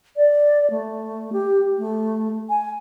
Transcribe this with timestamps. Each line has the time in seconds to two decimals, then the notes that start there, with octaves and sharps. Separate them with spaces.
0.16 D5
0.70 A3
1.33 G4
1.78 A3
2.49 G#5